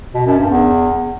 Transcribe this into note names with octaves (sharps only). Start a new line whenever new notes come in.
B2
F#2
G2
E2